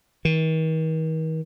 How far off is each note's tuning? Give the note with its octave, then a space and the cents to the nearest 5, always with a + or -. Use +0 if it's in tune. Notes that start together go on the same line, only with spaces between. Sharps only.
D#3 +45